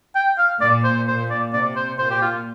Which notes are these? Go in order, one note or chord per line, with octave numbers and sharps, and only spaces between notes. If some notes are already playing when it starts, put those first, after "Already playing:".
G5
F5
A#2 D5
C5
A#2 C5
D5
C3 D5
C5
A#2 C5
G4
F4